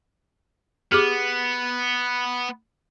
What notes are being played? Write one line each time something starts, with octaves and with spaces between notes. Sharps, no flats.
B3 G4 G#4 D6